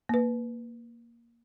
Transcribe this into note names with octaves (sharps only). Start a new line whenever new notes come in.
A#3 B4